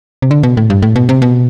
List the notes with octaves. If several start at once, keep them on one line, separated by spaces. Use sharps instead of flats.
C3
D3
B2
A2
G2
A2
B2
C3
B2